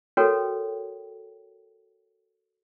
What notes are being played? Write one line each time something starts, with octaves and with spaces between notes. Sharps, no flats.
F#4 A4 A#4 C#5 G5